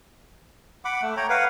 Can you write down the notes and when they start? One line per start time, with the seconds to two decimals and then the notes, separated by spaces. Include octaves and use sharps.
0.85 F#5 B5 D6
1.02 A3
1.17 C#5 G5 A#5
1.29 B4 F5 F#5